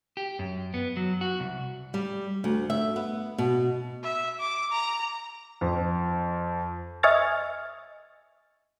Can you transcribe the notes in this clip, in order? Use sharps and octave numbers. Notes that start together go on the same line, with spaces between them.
G4
F#2
B3
F#3
F#4
C2
G3
D2
E5
B3
B2
E5
D6
A#5
F2
D#5 E5 G#5 C#6 F6 A6